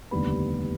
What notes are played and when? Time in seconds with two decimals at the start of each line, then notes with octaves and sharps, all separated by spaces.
0.11 F1 D#2 D3 G3 B3 B5